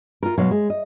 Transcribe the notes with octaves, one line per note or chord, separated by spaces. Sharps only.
F4 A#4
B2 F#3 G#3 F5
G#3
D#5